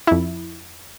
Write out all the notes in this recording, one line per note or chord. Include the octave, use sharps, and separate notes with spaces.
F2 E4